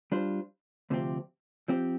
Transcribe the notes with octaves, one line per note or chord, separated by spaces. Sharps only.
G3 D4 F4 C5
D2 C3 F3 C4 G4
F3 C4 G4